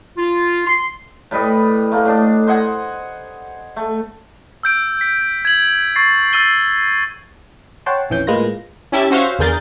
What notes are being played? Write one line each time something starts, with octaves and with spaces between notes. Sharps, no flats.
F4
C6
A2 G3 B4 D#5
A3 A#3
A2 D4 D#5
C5 D#5 F#5 G#5
A3
E6 G6 D7
B6
G#6 F#7
C#6 A6 C7
E6 A6 D#7 G7
C#5 F#5 G5 A5 C6
A#1 F2 E3 C#4 G6
A2 G#3 A#3 F4 B4 A#6
C#4 E4 G4 E5 A5
C#4 F#4 C5 C#5 E5 F5
E2 D3 G#4 A#4 G6 A6